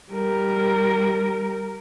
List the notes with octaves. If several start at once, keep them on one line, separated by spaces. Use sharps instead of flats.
G3 A#4